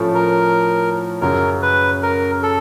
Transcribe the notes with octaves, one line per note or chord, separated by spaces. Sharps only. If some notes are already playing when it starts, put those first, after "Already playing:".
Already playing: A2 F3 A3 C#4
A#4
F#2 C#3 F#3 A#4
B4
A#4
A4